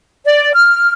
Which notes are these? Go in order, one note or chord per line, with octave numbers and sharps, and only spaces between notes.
D5
F6